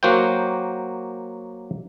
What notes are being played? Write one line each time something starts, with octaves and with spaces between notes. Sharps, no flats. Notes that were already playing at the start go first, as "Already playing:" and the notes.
F#3 A#3 F#4 C5 G5